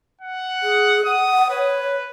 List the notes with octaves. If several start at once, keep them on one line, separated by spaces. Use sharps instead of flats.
F#5
G#4
F#5 D#6
B4 C#5